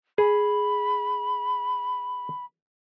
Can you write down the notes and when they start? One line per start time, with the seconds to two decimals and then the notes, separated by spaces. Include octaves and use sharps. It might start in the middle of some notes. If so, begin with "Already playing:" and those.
0.18 G#4 B5